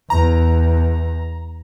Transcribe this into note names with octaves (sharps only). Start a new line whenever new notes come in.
E2 A#5